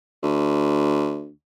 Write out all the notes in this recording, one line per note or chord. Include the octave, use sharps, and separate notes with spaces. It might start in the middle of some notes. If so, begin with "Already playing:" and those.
D2